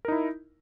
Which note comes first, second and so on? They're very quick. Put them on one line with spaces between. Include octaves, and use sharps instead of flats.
A#4 D#4 E4